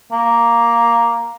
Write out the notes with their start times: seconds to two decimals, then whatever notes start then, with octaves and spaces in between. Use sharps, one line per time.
0.13 A#3